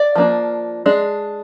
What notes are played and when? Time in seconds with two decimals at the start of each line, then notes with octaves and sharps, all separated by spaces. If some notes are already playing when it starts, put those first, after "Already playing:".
Already playing: D5
0.15 F3 A#3 D4
0.86 G#3 D4